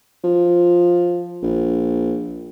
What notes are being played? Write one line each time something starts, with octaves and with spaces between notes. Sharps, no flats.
F3
A#1